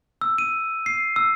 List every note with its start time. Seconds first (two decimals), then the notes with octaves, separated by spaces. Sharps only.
0.21 E6
0.38 D#7
0.86 C7
1.16 E6